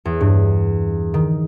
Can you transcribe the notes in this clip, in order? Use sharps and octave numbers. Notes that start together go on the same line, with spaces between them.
E2
G2
D#3